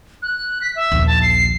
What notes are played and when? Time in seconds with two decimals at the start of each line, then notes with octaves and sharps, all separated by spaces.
0.22 F#6
0.61 B6
0.76 E5
0.92 A#1 D#2
1.07 A5
1.22 C7